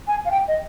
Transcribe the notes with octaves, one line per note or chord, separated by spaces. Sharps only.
G#5
F5
G5
D#5